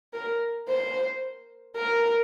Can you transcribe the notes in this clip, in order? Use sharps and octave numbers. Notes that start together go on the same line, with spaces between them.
A#4
C5
A#4